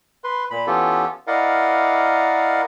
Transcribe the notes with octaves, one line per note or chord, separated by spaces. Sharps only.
B4 C6
A#2 B5
E3 B3 C#4 F4 G4 A4
E4 A#4 D5 D#5 F5 F#5